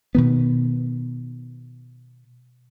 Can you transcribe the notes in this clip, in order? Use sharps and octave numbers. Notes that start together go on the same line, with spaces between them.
B2 D#3 B3